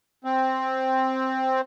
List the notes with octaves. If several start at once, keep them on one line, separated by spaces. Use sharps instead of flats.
C4